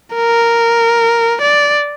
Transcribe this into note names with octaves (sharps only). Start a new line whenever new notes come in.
A#4
D5